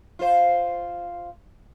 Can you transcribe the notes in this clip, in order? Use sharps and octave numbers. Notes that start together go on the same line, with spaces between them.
F4 C5